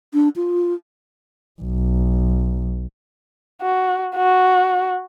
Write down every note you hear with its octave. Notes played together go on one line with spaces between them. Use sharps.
D4
F4
B1
F#4
F#4